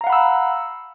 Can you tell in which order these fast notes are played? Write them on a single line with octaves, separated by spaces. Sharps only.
A#5 F5 F#5 B5 E6